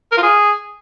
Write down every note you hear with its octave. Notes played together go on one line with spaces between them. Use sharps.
A#4
F4
G#4